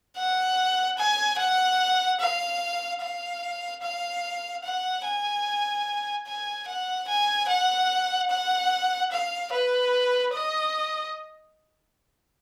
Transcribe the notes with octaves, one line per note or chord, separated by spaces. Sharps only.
F#5
G#5
F#5
F5
F5
F5
F#5
G#5
G#5
F#5
G#5
F#5
F#5
F5
B4
D#5